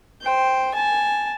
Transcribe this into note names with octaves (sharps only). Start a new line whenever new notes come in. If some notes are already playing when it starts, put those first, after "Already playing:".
C5 G5
G#5 A5